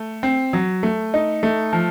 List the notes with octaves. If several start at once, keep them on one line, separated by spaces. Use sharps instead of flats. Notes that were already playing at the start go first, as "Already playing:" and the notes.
Already playing: A3
C4
F#3
A3
D#4
A3
F3